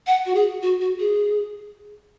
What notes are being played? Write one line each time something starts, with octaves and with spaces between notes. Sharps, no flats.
F#5
F#4
G#4
F#4
F#4
G#4